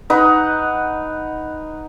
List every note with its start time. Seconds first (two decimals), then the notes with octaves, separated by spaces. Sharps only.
0.10 D#4 B4 F#5